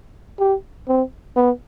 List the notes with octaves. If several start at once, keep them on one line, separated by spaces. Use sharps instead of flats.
G4
C4
B3